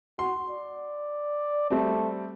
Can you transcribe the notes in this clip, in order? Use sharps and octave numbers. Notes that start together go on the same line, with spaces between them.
F#4 C6
D5
G3 A3 C4